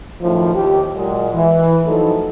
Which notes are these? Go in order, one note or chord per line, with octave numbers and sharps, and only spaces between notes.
F#2 A2 D#3 F3
D#2 G4
A#2 F#3 G#3
E3
F3 F#3 A3 D#4 E4 A4